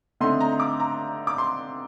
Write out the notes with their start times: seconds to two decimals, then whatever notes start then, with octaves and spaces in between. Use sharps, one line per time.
0.20 D3 A3 C4 D#4 C6
0.40 A#5
0.60 D6
0.80 A#5
1.27 D6
1.38 C6